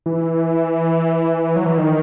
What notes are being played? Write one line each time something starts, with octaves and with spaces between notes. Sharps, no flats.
E3
F#3
E3
D#3